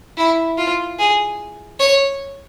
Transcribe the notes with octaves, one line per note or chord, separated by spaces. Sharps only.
E4
F4
G#4
C#5